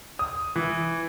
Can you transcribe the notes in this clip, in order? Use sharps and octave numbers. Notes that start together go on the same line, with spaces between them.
D#6
E3